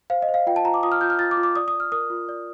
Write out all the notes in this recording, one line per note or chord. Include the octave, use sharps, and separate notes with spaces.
C5 F5
D#5
C5
F5
F4 G5
A5
F4 A#5
D6
F4 D#6
F6
F4 G6
F6
F4 A6
D6
F4
D6
D5 D#6
D#6
D5
F6
A#4 D#6
F4
D5